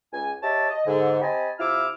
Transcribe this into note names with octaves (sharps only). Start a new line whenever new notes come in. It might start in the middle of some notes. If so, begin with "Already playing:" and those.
C#2 G#5
G4 C#5 D#5 E5 A5
D#5
G#2 D3
C4 G4 D#5 G#5 A5 B5
C3 E4 F4 D6 E6 F6